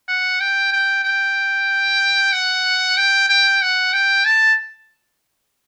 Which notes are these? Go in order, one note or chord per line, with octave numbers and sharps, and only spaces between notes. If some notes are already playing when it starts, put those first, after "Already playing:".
F#5
G5
G5
G5
F#5
G5
G5
F#5
G5
A5